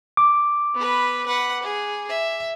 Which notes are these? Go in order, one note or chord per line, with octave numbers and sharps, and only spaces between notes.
D6
B3 B4
B4 F#5
G#4
E5